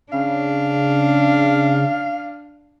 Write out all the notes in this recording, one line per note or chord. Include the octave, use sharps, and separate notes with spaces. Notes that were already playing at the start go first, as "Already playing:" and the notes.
C#3 D4 F5